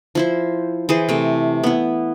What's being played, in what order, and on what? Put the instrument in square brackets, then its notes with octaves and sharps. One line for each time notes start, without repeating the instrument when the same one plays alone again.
[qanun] F3 E4 C5
E3 G#4 C5
C3 A3
B3 E4